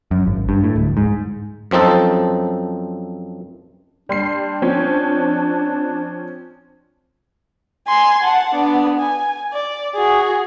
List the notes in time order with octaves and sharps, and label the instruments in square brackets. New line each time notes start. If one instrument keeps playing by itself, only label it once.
[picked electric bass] F#2
G#1
G2
A2
D1
G#2
[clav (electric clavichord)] F#2 F3 C4 D#4 A4
[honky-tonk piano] G3 C6 C7 [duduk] D4
[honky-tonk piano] F3 C4 C#4
[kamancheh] G#5 C6
F#5 A5
B3 D4
G#5
D5
F#4 G#4